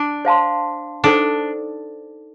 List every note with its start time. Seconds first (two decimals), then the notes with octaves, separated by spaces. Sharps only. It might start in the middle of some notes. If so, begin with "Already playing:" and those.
Already playing: D4
0.25 C5 F5 A5 C6
1.04 D4 D#4 A4 C5 G5